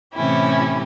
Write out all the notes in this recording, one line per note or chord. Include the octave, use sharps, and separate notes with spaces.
A2 C3 E3 C#4 E4 G4